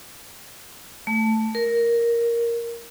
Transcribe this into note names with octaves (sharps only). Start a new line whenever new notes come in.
A3
A#4